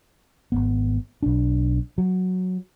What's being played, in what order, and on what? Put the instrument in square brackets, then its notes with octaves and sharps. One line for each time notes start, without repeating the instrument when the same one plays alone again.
[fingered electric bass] G#1 F2 B3
B1 D4
F#3